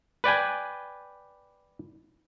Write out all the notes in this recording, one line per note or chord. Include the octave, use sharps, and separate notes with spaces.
B4 D5 G5 G#5